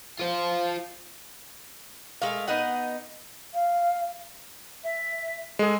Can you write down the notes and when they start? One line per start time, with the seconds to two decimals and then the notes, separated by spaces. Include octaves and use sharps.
0.19 F4 C5
2.22 G#3 A3 A#4 F5
2.48 B3 D#4 D#5 F#5
3.54 F5
4.83 E5
5.59 G#3 G#4 A4